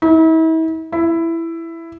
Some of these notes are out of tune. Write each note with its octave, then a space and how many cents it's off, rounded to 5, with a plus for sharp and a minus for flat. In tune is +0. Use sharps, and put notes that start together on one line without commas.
E4 -40
E4 +10